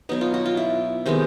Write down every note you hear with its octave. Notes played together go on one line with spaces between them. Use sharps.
B2 F#3 B3 D#4
F4
F#4
F4
E4
C3 D#3 G#3 B3